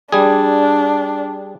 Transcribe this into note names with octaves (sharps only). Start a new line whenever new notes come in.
G3 D4 G#4